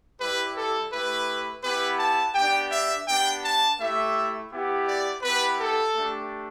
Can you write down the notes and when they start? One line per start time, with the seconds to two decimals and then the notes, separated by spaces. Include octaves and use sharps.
0.19 G3 E4 G4 B4
0.56 A4
0.91 A3 E4 G4 B4
1.63 B3 E4 G4 B4
1.99 A5
2.35 B3 D4 G4 G5
2.71 E5
3.07 B3 D4 G4 G5
3.43 A5
3.78 A3 E4 G4 E5
4.51 B3 E4 G4
4.86 D5
5.22 B3 E4 G4 B4
5.59 A4
5.95 A3 D4 G4